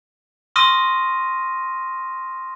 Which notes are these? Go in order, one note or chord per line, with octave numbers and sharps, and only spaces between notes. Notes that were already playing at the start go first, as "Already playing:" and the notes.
C6 C#6 D#6 F6 A#6 D#7